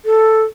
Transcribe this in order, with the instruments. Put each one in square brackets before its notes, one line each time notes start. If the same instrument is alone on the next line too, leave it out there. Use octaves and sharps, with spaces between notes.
[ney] A4